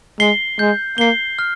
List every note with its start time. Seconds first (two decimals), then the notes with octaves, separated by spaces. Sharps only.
0.19 G#3 C7 G7
0.59 G#3 G6
0.98 A#3 C7 G7
1.39 F6